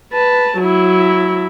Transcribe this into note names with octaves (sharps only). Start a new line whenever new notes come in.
B4 A5
F#3 E4